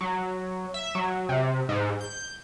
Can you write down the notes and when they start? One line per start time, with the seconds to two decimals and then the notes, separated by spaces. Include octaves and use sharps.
0.01 F#3
0.74 E5
0.95 F#3
1.29 C3
1.69 G#2
2.01 G6